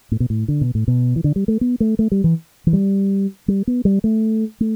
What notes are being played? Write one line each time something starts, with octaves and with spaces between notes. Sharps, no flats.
A2
B2
A2
D3
B2
A2
B2
E3
D3
G3
A3
B3
A3
A3
G3
E3
E3
G3
G3
B3
G3
A3
A3